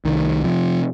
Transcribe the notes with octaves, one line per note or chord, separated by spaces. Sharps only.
C2 D#3
C3 F3